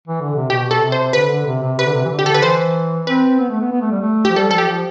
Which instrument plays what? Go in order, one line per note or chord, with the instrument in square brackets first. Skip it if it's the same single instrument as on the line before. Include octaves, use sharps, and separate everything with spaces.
[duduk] E3
D3
C3
[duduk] B2 [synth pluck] G4
[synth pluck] A4
[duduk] C3
[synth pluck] C5
[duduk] D3 [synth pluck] B4
[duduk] D3
C3
C3
[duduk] C3 [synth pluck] B4
[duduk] D3
C3
E3
D3
[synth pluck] G4
A4
[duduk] D3 [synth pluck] B4
[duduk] E3 [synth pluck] C5
[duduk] C4 [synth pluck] B4
[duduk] B3
A3
B3
B3
A3
G3
A3
[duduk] F3 [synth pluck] G4
[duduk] G3 [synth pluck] A4
[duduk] G3
[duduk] F3 [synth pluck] A4
[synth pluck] G4
[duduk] F3